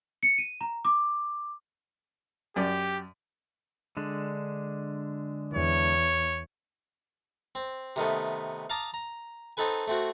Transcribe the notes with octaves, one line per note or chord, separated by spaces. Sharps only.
C#7
D#7
A#5
D6
F#2 G4 D5
D3 G#3 D4
E2 C#5
C4
C3 D#3 A3 B3
F5 A5 A#5 D6 D#6
A#5
C4 D#4 A4 B4 G#5
A3 C4 F#4